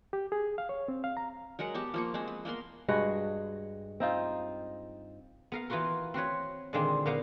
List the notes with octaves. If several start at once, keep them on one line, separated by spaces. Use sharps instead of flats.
G4
G#4
F5
C#5
C4
F5
A#5
F#3 G#3 A#4 F#5
B3 G4 A5
F3 A#3 C#6
G#3 C4
B4
A#3 B3 A#4 C6
G2 G#3 F#4 F#5
C4 D#4 F4
B3 A#4 F5
E3 B3 F4 F#4 A#4
C4 F#4 B4 C#5
A#2 D3 D#3 G#3 A#3 C4
A#2 A#3 B3 F5